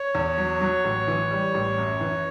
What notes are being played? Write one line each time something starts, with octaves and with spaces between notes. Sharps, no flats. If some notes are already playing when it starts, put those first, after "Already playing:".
Already playing: C#5
E2
F#3
F#3
A1
E3
G3
A1
F#2
E3